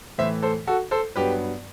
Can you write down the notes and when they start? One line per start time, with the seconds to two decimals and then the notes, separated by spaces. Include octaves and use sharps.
0.18 A2 E3 A3 C5 E5
0.42 A4 C5
0.67 F#4 A4
0.91 A4 C5
1.16 G2 F#3 B3 G4 B4